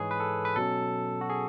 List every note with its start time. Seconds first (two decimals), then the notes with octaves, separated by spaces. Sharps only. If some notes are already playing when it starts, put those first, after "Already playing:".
Already playing: G#2 E3 G#3 G#4 B4 C#5
0.11 B4
0.20 A4
0.45 B4
0.56 B2 F#3 C#4 A4
1.21 F#4
1.30 G#4